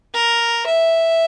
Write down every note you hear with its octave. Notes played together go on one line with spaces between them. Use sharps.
A#4
E5